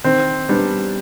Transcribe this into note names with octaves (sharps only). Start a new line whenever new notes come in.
D#3 C4
G3 B3 D4